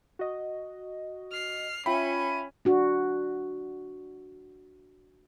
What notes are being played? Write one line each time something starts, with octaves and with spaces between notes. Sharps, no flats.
F#4 D#5
F6 C7
C#4 F4 E5 G5 B5 D#7
D4 F#4